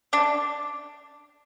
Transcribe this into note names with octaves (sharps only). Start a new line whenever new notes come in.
D4